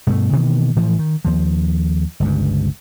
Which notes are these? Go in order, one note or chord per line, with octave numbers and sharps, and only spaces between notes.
G2 B2 A3
B2 D#3 E3 A#3
A2 E3 F3
D#3
D#2 F3
G1 C#2 G2